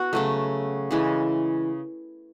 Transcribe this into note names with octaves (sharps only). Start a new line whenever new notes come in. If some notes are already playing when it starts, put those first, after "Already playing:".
Already playing: B3 F#4
C#3 F#3 A3
C#3 E3 G#3